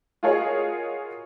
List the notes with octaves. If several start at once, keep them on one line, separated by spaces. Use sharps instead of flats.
F4 F#4 G#4 A#4 C#5 D#5